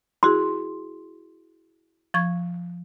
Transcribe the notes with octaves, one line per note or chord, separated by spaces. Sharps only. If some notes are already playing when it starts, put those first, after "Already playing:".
E4 F#4 G#4 C6
F3 C#6 G#6